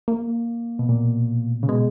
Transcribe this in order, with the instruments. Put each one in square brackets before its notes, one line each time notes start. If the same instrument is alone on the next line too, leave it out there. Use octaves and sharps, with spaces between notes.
[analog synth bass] A#3
[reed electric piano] B2
A#2
C#3
[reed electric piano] B2 [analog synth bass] G#3